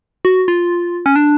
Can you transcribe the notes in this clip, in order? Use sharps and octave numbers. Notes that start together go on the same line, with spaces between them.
F#4
F4
C#4
D4